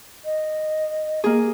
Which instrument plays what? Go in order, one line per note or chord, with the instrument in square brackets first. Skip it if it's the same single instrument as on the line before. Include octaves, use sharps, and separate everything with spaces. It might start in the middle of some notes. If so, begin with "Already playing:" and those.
[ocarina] D#5
[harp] A#3 G#4